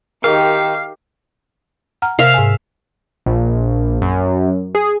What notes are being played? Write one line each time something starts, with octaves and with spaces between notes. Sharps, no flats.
D#3 G4 G#4 A#4 F5 G5
F#5 A#5 F6
C3 A#4 E5 F5
G#2 G#5
A#1
F#2
G#4